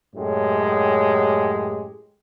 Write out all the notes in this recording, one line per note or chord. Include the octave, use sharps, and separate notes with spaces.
F#2 A2 G#3 G4